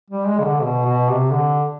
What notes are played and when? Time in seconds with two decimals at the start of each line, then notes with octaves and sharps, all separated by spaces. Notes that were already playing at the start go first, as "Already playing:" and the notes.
0.10 G3
0.27 G#3
0.40 C#3
0.45 D3
0.62 B2
0.86 B2
1.09 C3
1.31 D3